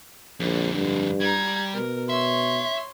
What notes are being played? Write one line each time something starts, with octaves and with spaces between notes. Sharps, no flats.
A#1 F2 D3
G2
G3 A#5 G#6
B2 A#4
C#5 E5 C6